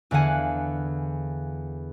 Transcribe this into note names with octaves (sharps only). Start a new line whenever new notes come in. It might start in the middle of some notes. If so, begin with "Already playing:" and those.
E2 D3 F5 F#5 G#5